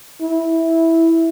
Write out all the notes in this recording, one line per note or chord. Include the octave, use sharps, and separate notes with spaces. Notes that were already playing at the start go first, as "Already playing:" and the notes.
E4